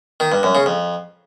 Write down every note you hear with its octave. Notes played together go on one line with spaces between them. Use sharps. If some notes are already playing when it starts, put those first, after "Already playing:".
D#3
G2
F#2
C#3
F2